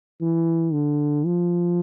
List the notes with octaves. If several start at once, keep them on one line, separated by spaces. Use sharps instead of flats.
E3
D3
F3